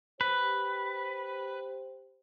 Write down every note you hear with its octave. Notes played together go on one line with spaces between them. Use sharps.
G4 B4 C5